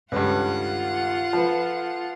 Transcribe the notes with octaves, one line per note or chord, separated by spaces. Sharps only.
C#2 G2 D#3 F4 A4 B4 F#5
F3 A4 B4